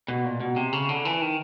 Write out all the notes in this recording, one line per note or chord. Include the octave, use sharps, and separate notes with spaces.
B2
A#2
B2
C3
C#3
D3
E3
D#3